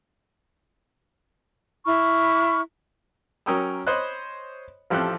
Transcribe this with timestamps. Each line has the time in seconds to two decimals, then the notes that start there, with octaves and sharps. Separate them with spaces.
1.86 E4 B5 C#6 F6
3.46 F#3 C#4 A#4 G5 D#6 E6
3.87 C5 C#5 D#5 B5 D#6 F#6
4.90 A1 F3 G4 A4 G5 F#6